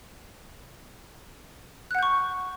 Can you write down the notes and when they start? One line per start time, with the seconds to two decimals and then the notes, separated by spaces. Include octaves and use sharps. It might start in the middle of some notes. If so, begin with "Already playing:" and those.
1.91 F#6
1.95 F#5
1.99 G6
2.03 C#6